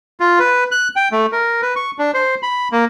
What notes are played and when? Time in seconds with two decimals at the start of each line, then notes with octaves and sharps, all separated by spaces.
0.20 F4
0.39 B4
0.71 F#6
0.96 G5
1.12 A3
1.32 A#4
1.62 B4
1.76 C#6
1.99 D4
2.14 C5
2.43 B5
2.72 A#3